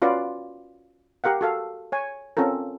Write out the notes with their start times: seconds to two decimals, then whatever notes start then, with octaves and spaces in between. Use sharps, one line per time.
0.02 C#4 F4 F#4 B4 D5
1.24 G4 A#4 F5 F#5
1.41 F#4 A4 F5
1.92 C#5 G#5
2.37 C4 C#4 F4 A4 A#4